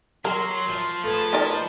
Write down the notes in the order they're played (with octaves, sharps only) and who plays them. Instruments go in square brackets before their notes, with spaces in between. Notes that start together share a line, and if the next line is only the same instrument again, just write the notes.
[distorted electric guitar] F#3 [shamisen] A#4 [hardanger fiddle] C6
[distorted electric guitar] F3 [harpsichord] E5
[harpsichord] A3 F4 G#4 [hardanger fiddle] B4 A5
[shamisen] D#3 A#4 D5